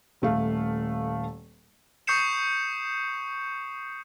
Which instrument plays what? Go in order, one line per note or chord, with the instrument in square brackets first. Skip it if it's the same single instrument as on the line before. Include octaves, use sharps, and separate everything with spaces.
[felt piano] D#1 A3 F5
[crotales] C#6 D#6 G6 C7 C#7 E7